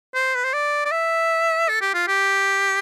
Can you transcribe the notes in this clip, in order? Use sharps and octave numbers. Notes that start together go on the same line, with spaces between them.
C5
B4
C5
D5
D5
E5
A4
G4
F4
G4